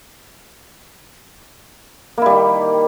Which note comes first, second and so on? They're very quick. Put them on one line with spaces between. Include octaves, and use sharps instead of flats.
A#3 E4 G3 D#3